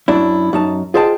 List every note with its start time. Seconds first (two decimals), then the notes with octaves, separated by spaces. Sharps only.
0.08 F#2 D4 E4
0.53 F#2 D#4 A5
0.94 F4 G#4 C5 D#5 G5 A5